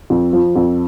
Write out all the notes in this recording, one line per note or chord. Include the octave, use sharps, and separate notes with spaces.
F2
F3
F2